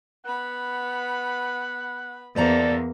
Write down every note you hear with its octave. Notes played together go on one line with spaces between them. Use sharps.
B3 F#5 B5
E2 A#3 A4 C5 D5 A#5